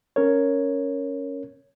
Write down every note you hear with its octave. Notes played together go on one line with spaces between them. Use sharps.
C#4 A#4 C#5